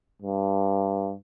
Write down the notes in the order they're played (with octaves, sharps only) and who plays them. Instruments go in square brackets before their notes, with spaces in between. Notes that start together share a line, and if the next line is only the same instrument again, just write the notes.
[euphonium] G2